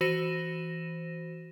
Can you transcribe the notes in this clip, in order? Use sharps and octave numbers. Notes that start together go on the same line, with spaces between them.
E3 F#4 C5 A#6 D#7 E7